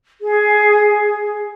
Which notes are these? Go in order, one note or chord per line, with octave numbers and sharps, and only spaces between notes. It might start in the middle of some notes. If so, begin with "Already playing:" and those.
G#4